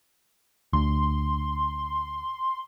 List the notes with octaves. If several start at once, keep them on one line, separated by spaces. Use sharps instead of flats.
D2 C6